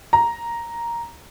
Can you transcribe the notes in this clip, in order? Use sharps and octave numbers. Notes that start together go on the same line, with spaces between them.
A#5